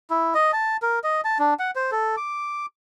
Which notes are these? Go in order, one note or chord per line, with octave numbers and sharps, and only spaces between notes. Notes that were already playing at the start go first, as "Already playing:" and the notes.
E4
D#5
A5
A#4
D#5
A5
D4
F#5
C5
A4
D6